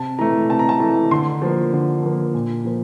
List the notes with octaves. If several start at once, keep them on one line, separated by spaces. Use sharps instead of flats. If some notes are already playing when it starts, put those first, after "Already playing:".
Already playing: C3 A5
E3 A3 A#5
C3 A5
A#5
A5
E3 A3 A#5
D3 C6
F3 A#3
D3
F3 A#3
A#2
F3 A#3